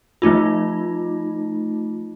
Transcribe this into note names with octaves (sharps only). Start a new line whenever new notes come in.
F3 A3 D#4 F4